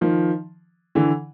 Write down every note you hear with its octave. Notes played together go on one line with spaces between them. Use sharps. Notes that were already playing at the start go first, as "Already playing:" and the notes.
D#3 F3
D3 E3